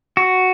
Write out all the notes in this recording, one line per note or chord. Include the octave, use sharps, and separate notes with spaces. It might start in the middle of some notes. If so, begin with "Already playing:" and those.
F#4